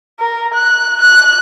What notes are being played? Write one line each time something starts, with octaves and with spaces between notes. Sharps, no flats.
A#4
F#6
F#6